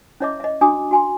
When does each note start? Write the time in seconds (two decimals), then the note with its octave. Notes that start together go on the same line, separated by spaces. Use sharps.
0.20 C#4 E4 C#5 D#5 E5 D6
0.40 D#5 E5
0.61 D4 F#4 G#5 D6 D#6
0.91 F#4 G#5 C6